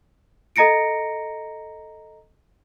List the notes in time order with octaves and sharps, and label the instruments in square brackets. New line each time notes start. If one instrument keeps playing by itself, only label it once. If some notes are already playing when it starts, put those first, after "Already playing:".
[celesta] A4 D#5 A#5 A#6 C#7 D7